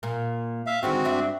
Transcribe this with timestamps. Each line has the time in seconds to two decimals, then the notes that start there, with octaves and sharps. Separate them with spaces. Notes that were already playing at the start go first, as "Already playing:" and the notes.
0.03 A#2 A#3
0.66 E5 F5
0.83 D3 D#3 G#3 C4 F#4
1.04 G2 D4 E5